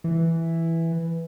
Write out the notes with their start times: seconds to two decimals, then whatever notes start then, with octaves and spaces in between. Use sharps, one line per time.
0.04 E3